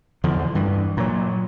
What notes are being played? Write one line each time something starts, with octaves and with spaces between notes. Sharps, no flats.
E2 D3 F3
G2 E3
A#2 F#3